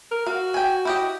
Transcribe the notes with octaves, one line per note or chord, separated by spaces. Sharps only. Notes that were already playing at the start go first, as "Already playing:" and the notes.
A#4
F#4 F5
G5 G#5
E4 G4 D#5